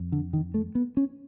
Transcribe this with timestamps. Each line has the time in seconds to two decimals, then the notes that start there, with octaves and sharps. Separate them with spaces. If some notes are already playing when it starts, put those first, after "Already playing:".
Already playing: F2
0.12 D3
0.33 D#3
0.54 A3
0.75 B3
0.97 C#4